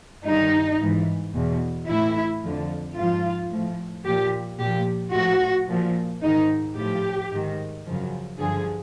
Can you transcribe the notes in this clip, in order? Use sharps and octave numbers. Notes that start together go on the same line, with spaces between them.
G2 D#3 D#4
G#2 E3
E2 B2
A2 E3 E4
F2 D3 F3
G#2 F3 F4
A2 F3
A#2 F3 G4
A#2 F3 G4
A2 F3 F#4
A#2 F3
G#2 D#3 D#4
A2 F3 G4
G#2 D#3
F#2 C#3 F3
G2 D3 F3 G#4